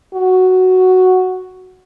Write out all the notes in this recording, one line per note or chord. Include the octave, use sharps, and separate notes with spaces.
F#4